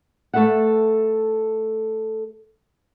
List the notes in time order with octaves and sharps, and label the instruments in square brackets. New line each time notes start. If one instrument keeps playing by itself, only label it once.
[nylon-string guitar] A3 A4 B4 E5 F#5